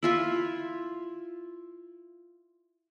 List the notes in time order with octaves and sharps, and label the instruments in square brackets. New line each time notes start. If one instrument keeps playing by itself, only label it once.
[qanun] E4 F4 E5